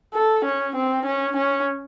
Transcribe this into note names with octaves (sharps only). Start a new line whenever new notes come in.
A4
C#4
C4
C#4
C#4